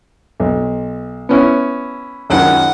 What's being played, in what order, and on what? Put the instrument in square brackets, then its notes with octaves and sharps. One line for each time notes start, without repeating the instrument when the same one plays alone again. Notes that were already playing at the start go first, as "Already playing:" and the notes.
[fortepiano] B1
B3 C#4 E4
[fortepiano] C#2 F#2 D#3 [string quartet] F#5